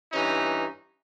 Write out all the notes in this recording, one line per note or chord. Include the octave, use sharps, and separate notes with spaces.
G2 E3 C#4 D#4